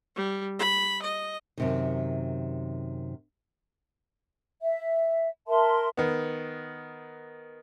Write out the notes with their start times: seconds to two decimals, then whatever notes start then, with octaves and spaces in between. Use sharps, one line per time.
0.16 G3
0.59 B5
1.02 D#5
1.58 F#2 C3 D#3
4.61 E5
5.47 A#4 E5 A5 C6
5.97 D#3 B3